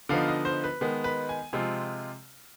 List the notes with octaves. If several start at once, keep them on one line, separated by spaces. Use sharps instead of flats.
D3 F3 B3 D#4 F5
D#5
C5
B4
D#3 G#3 B3
B4
G#5
C3 F3 G#3 C4 F4 G#5